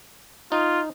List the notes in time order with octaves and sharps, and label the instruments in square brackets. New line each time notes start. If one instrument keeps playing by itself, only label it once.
[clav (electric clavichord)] D#4 [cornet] F4